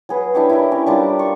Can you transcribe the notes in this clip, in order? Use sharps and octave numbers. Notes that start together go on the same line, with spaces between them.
F#3 G#4 B4
D4 E4 G4 C#5
E4 A#4 D#5
C#4
G3 D4 F4 A#4
C#6